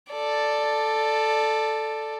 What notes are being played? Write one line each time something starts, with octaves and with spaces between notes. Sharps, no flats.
A4 D5